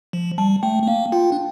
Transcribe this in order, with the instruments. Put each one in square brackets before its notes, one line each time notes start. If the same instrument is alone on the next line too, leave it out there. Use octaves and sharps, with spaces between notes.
[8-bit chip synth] F3
[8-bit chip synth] G3 [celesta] A5
[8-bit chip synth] A3 [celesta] G5
[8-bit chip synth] A3
[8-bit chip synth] A#3 [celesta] F5
[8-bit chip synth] F4 [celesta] G5
[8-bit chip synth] D4